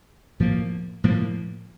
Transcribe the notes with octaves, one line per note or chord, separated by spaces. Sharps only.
A2 F3 A#3
A2 F3 A#3